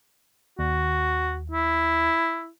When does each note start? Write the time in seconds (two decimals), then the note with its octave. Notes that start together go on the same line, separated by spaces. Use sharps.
0.59 D#2 F#4
1.52 E4